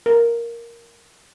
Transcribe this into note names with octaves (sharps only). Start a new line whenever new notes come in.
A#4